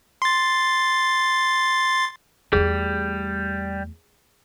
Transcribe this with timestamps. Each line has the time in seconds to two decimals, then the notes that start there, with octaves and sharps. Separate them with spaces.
0.22 C6 A6
2.53 E2 G3 A3 G#4